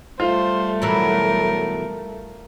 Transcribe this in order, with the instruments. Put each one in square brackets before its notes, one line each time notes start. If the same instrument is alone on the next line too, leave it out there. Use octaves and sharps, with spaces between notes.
[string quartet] G3 A3 [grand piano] F4 [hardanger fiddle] C5
[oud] B2 E3 F#3 [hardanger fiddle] A#4